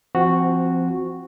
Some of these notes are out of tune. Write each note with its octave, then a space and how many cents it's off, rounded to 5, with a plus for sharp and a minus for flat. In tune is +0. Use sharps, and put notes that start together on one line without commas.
F3 -25 C4 +0 F#4 -5